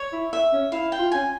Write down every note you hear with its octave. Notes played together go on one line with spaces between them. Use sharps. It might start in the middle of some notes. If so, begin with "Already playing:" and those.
Already playing: C#5
E4
E5
C#4
E4 F5
G5
F4
C#4 G#5